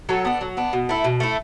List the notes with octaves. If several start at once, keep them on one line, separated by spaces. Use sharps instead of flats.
F#3 A4 C#5
B3 D4
F#3
B3 D4
B2
A3 E4
B2
A3 E4